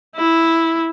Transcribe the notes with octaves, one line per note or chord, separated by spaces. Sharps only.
E4